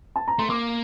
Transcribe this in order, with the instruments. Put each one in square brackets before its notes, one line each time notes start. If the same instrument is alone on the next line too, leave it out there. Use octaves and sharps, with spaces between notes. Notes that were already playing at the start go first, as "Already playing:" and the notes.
[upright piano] A5
A#5
[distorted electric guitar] A3 [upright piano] C6
[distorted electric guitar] A#3 [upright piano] D6